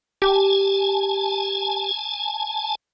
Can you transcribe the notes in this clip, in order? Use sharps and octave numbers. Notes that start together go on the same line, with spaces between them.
G4 G#5 A5